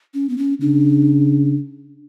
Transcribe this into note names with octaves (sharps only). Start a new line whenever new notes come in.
C#4
B3
C#4
C#3 D4